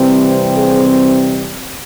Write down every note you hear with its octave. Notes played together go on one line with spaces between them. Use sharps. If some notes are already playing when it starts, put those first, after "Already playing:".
Already playing: C3 E3 G3 C4
G#4 C5